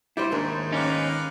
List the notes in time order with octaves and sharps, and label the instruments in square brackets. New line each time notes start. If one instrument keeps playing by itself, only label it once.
[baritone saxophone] G3 [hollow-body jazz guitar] E4 C5
[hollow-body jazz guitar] D#2 D4 A#4 [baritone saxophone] G#2
[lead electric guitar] C#4 D#4 [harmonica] G4 B4 F5